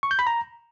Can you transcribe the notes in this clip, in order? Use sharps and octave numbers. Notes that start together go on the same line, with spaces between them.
C#6
G6
B5
A#5